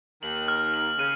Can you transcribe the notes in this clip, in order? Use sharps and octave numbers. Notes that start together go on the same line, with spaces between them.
D#2 D#3 F#7
F6
F#7
C#3 D#7